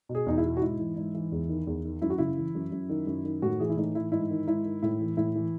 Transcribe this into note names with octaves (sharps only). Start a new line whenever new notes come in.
B2
G#4
E2 D#4
E4
B2
F#4
G#2 E4
E3
G#2
E3
E2
D#3
E2
D#3
F#2 E4
F#4
C#3 E4
E3
F#2
F#2
D#3
F#2
D#3
A2 F#4
E3 G#4
E4
A2 D#4
E3 E4
G#2 E4
D#3
G#2 E4
D#3
A2 E4
E3
A2 E4
E3